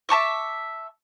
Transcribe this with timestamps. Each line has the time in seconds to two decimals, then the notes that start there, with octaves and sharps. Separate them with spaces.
0.09 E5 A5 C#6 D6